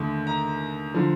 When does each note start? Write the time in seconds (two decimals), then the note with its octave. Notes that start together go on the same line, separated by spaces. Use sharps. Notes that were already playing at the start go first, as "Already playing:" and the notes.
Already playing: D#2 D3 A3
0.27 A#5
0.94 D3 F3